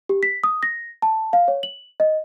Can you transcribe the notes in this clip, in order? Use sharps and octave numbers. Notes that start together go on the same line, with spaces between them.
G4
B6
D#6
A#6
A5
F5
C#5
F#7
D#5